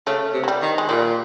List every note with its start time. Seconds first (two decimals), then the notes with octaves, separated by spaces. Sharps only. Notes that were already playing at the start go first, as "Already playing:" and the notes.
0.07 C#3 A3
0.34 C3
0.44 F#3
0.48 G3
0.62 D#3
0.78 G#3
0.89 A#2 G3